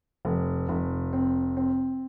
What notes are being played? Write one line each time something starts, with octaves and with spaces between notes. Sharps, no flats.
F1
F1
C4
C4